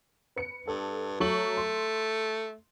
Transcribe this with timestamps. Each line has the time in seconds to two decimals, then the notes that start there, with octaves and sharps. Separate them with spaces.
0.36 B4 C#7
0.68 G2 A4
1.20 F#3 A3 C#6 F#7
1.57 C6